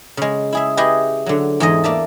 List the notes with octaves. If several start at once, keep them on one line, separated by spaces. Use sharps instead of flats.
C#3 G#3
E4 G#4 E5
E4 G4 G#4 B4 D#5 G#5
D3 F#3
E2 G#2 G#3 D#5
A#3 D5 E5 A5